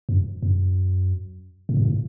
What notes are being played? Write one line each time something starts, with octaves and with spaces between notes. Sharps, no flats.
F#2
F#2
A2
G#2
A2